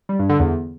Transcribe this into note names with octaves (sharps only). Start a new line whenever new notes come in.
G3
G2
D3
E2